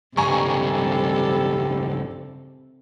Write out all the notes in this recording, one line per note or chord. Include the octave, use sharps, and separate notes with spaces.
C#2 G2 C3 G3 A4 G#5 A#5 C#6